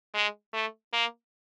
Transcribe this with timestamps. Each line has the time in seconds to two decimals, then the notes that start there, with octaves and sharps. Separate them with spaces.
0.15 G#3
0.53 A3
0.93 A#3